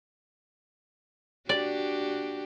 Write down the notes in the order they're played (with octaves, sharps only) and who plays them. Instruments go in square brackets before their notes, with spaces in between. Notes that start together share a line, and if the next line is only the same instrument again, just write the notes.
[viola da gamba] D4 F#4 G4 [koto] D5